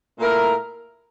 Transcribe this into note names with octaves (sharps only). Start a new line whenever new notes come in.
A#2 A3 E4 A#4